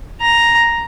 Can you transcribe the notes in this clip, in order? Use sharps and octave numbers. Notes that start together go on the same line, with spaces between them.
A#5